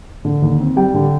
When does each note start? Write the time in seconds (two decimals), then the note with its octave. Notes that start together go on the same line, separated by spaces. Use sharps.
0.25 D3
0.42 D#2
0.60 C4
0.76 G3 G5
0.94 D3